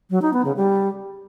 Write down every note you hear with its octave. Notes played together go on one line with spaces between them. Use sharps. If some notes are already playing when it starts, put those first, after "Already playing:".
F#3
D#4
B3
C#3
G3